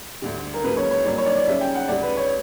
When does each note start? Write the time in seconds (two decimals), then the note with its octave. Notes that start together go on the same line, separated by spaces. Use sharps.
0.22 D2 D3 G3
0.54 A#4
0.64 C#2 C#3 F#3 A#3 B4
0.77 C#5
0.91 C#5
1.05 G2 F#3 A#3 D4 D5
1.18 C#5
1.26 D5
1.36 D5
1.47 C#3 G3 C#4 E5
1.61 G5
1.75 F#5
1.88 D2 C#3 G3 D5
2.02 B4
2.17 C#5